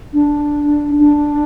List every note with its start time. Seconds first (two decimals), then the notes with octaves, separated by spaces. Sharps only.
0.13 D4
0.99 D4